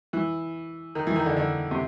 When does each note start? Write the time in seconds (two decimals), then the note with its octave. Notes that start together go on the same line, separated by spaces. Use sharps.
0.13 E3
0.95 D#3
1.07 E3
1.16 D#3
1.26 D3
1.36 D3
1.71 C3